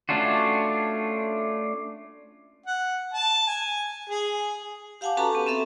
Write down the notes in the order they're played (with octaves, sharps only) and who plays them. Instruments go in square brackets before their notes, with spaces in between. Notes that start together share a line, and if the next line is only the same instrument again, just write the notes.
[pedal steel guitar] A3 C#4 D4 F4 F#4
[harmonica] F#5
A5
G#5
G#4
[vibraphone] G4 F5 F#5 G#5 A5 D6
C#4 F#4 A4 B4 A5 A#5
B3 G4
C4 C#4 A4 E5